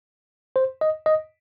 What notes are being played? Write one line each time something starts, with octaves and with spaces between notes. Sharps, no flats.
C5
D#5
D#5